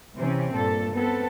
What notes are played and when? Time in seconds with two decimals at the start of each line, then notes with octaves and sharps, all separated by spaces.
0.16 C3 E3 C4 C#4
0.53 G2 A#2 A4
0.94 B3 C4 A4